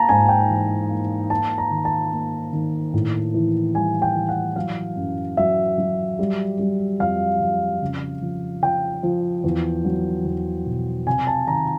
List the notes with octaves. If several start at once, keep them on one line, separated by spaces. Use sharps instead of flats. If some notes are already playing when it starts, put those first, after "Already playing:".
Already playing: A#3 A5 A#5
G#2 G#5
G5
E3
A#3
A#3 A5
A#5
D#3
A5
A#3
D#3
A2
E3
G3 G#5
G5
E3
F#5
F#3 F5
F#2
F#3 E5
F#3
G3
G3
F2 F5
F2
C#3
F3
F3 G5
F3
E2
F#3
E2
B2
C3 G#5
A5
D#3 A#5